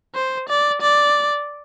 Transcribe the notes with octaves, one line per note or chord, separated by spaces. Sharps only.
C5
D5
D5